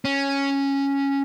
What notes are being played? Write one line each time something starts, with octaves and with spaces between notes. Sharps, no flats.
C#4